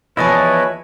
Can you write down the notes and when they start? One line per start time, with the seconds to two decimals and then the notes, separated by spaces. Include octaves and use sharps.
0.17 E2 F3 E4 B4 C#5 D#5 G#5 A5